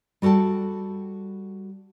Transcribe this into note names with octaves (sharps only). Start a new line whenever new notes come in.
G3 F#4 A4 G5 A5